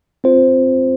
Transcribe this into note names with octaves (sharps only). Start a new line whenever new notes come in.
C4 F4 C5